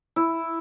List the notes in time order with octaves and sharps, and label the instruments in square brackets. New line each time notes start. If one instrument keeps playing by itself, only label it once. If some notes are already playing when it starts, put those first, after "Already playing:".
[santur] E4